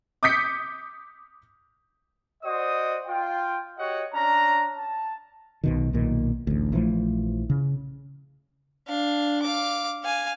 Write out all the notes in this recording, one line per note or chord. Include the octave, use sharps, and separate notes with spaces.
D6 D#6 G6 B6 C#7
F#4 C5 D5 D#5 D#6
F4 G5
F#4 G4 C#5 D#5 F#5
C#4 D4 A#5
A5
B1 B2 D#3
B1 A#2 D#3
A1 D2
A#1 E3 F3 A3
C#3
D4 F5
F5 D6
F5 G#5